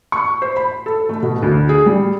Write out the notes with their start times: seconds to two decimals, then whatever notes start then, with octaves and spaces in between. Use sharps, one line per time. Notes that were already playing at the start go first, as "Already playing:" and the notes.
0.12 C#6
0.42 C5
0.57 B5
0.86 A4
1.09 A3
1.22 B2
1.42 D2
1.69 G#4
1.86 G3